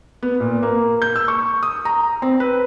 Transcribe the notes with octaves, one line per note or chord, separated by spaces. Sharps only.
B3
A#2
A#3
G6
E6
C#6
D#6
A#5
C4
B4